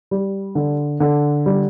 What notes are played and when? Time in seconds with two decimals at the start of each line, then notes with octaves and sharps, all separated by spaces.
0.11 G3
0.55 D3
1.00 D3
1.46 G3